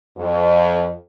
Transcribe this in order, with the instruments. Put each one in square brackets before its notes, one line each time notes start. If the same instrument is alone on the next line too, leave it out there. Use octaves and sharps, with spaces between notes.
[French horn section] F2